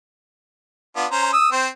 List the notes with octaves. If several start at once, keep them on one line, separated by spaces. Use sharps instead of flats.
B3 D4 F4
C#4 C5 A#5
D#6 E6
C4 C5